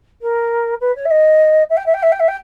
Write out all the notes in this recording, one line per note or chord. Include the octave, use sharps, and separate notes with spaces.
A#4
B4
C#5
E5
D#5
E5
G5
E5
G5
E5
G5
E5
G5